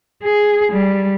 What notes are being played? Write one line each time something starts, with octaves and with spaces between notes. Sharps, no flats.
G#4
G3